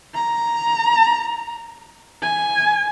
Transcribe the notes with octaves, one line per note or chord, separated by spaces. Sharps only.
A#5
G#5